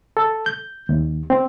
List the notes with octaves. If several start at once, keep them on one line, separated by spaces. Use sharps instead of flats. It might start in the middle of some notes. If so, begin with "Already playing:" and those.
A4
G6
D#2
C4